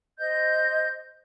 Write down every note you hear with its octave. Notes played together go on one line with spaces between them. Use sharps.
C5 D#5 G6